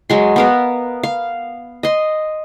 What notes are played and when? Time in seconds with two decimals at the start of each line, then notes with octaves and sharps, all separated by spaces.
0.10 F#3 G#3 C6
0.36 B3 A#4 F5
1.03 F5
1.83 D#5 C6